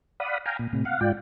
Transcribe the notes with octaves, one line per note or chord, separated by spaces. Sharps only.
D5 F5 F#5 B5 D#6
F5 G5 G#5 A#5
A#2
A2 C3
F5 F#5
G#2 F4 D5 G5